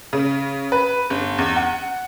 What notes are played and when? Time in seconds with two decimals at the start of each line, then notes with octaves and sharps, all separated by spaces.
0.13 C#3
0.72 B4
1.10 G1
1.38 E2
1.56 F#5